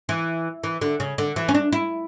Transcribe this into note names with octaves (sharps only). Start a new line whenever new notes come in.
E3
E3
D3
C#3
D3
E3
C#4
D4
E4